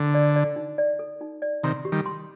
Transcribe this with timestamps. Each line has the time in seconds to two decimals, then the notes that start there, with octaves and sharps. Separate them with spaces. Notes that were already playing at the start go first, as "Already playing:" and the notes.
Already playing: D3
0.14 D5
0.36 D5
0.56 D#4
0.78 D5
0.99 A4
1.21 D#4
1.42 D5
1.64 C3 D#3 C6
1.85 G4
1.92 D#3 G3
2.06 C6